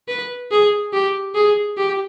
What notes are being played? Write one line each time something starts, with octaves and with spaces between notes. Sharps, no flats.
B4
G#4
G4
G#4
G4